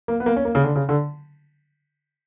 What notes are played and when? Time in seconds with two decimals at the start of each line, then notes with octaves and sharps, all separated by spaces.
0.08 A#3
0.20 B3
0.26 A#3
0.36 C#4
0.45 A#3
0.55 C#3
0.64 D3
0.75 C#3
0.89 D3